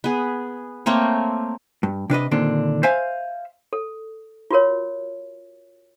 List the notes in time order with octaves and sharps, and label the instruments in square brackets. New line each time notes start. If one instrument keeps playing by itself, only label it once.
[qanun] B3 G#4
A3 A#3 C4 C#5
[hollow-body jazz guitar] G2
C3 D4 B4 D#5
A#2 D3 D#3 C4 D4
C5 E5 F5 G#5
[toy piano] A4
F4 F#4 A#4 C#5